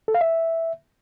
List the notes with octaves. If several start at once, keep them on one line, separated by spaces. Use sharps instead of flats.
A4
F5
E5